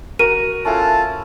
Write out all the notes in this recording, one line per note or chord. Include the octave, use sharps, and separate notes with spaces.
F#4 A#4 D#7
C#4 E4 F4 A4 F#5 A5